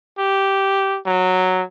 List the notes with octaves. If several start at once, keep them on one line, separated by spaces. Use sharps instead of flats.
G4
F#3